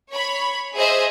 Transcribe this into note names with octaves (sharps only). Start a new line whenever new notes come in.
C#5 B5
G#4 C5 D#5 E5